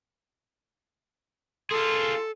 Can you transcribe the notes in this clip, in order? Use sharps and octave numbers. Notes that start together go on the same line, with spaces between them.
F4 G#4 A4 C6